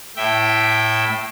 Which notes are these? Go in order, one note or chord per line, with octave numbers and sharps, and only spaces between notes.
A2 E5 G5